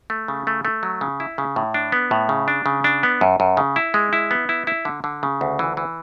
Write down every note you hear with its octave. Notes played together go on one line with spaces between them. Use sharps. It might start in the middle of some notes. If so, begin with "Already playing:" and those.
A3
C#3
A3
A3
F#3
C#3
E4
C#3
A2
D4
B3
A2
C#3
D4
C#3
D4
B3
F#2
F#2
C#3
E4
G#3
E4
B3
E4
E4
D3
D3
C#3
D2
E3
E3